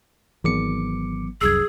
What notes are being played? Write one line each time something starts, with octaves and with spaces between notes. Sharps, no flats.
G#1 E3 F#3 B3 D6 C#7
F1 C2 F#2 G#4 E6 G#6